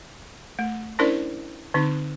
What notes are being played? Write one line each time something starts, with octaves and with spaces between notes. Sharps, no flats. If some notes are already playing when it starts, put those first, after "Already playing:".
A3
C#4 D4 E4 A#4 C5 D5
D3 C4 D#4